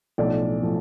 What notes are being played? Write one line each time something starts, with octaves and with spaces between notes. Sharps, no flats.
B1 A2 F3 D5
A2 F3